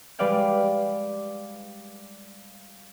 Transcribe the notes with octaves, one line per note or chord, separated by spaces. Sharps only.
G3 G#3 B4 D5 F5 G5